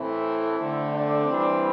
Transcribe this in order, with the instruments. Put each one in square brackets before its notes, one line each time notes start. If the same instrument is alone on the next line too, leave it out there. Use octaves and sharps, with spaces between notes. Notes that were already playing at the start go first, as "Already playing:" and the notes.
Already playing: [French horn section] A2 E3 A3 C4 E4
D3 A3 C4
D4
E3 G3 C4